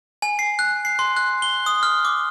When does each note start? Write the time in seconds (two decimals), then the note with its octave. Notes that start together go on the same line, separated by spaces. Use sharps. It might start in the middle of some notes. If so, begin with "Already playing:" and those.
0.22 G#5
0.39 C7
0.59 F#6
0.85 C7
0.99 C6
1.17 F#6
1.42 G7
1.66 D#6
1.83 F6
2.05 D6